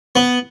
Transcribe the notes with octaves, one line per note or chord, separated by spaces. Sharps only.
B3